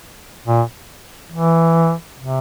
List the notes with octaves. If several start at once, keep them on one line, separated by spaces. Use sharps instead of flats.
A#2
E3
C3